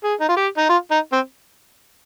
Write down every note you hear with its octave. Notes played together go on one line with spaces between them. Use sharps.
G#4
D#4
F4
G4
D#4
F4
D#4
C4